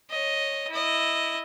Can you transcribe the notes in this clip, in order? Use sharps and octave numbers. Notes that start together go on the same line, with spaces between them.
C#5 D#5
E4 D#5